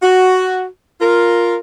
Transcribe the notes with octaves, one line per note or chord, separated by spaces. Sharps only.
F#4
F4 A#4